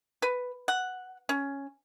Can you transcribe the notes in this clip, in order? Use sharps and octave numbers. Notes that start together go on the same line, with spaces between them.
B4
F#5
C#4